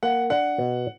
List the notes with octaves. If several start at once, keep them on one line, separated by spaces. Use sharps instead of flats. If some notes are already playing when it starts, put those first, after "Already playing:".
A#3 F#5
D4 F#5
B2